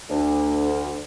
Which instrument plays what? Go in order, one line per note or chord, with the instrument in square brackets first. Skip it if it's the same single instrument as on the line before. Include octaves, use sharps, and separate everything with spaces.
[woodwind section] D2